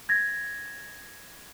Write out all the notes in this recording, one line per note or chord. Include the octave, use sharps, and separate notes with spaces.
G#6 A#6